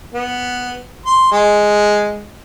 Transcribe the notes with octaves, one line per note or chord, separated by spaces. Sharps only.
B3
C6
G#3